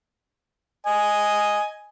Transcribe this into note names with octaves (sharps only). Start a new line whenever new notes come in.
D#5 G#5